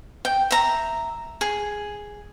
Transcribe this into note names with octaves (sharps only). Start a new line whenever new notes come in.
G5
E5 A#5
G#4